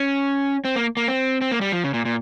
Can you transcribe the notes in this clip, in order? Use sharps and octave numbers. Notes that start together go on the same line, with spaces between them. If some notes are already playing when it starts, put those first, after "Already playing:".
Already playing: C#4
C4
A#3
A#3
C4
C4
A#3
G3
F3
C#3
A#2
A#2